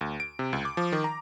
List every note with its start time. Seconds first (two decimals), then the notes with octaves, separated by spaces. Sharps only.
0.01 D2
0.20 D7
0.39 C3
0.53 C#2
0.65 D6
0.77 F3
0.92 D#3
1.04 A#5